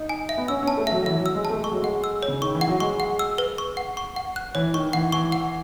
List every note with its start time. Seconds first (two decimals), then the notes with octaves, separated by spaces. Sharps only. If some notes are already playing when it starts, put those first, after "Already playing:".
Already playing: D#4
0.09 G#5
0.29 E5
0.38 B3
0.48 C#4 E6
0.63 C#4 A5
0.77 A3
0.87 F#3 E5
1.03 F#3
1.06 E3 E5
1.20 F#3
1.26 E6
1.35 G#3
1.45 A5
1.50 A3
1.61 G#3 C#6
1.71 F#3
1.82 G#3 F#5
2.04 E6
2.23 C#5
2.28 C#3
2.42 D#3 C#6
2.54 E3
2.61 F#5
2.68 F#3
2.80 G#3 C#6
3.00 F#5
3.19 E6
3.38 B4
3.58 C#6
3.77 F#5
3.97 C#6
4.16 F#5
4.36 F#6
4.55 E3 C#5
4.74 D#3 C#6
4.93 E3 F#5
5.12 E3 C#6
5.32 F#5